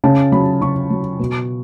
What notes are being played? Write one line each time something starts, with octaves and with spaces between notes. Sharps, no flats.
C#3 A5
F#3 B5
C#3 C#6
F#3
B2